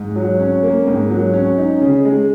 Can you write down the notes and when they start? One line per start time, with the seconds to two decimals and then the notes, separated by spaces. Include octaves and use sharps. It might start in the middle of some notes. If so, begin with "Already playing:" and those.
Already playing: G#2
0.16 F#3
0.40 C#4
0.63 A#3
0.87 G#2
1.10 F#3
1.33 C#4
1.58 D#4
1.81 C#3
2.05 G#3